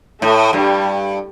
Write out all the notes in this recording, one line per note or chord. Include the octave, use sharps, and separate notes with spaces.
A2 A3
G2 G3